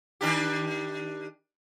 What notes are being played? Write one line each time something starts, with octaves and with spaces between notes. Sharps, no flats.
D#3 D4 G4